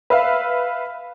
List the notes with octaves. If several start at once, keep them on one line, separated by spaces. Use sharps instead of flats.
B4 E5 F5